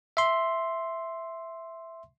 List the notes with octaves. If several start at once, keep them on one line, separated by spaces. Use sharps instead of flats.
E5 C6